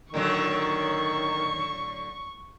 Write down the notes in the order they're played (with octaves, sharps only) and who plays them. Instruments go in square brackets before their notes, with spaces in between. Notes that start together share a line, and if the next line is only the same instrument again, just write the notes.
[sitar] A2 D3 F#3 [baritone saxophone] D#3 [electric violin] C#6